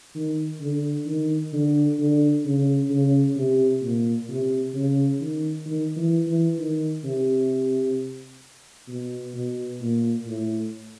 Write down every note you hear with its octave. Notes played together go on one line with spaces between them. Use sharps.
D#3
D3
D#3
D3
D3
C#3
C#3
C3
A#2
C3
C#3
D#3
D#3
E3
E3
D#3
C3
B2
B2
A#2
A2